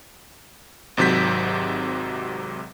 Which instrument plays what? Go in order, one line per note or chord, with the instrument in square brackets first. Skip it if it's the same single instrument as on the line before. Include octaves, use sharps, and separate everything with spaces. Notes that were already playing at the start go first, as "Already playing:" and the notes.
[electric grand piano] G#1 G#2 C3 F#3 G6 B6